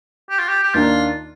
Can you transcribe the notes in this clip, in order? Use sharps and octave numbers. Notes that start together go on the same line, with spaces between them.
G4
F4
G4
G4
D#2 D#3 A#3 D4 F4